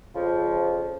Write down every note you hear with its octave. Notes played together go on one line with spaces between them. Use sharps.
F2 C#3 F3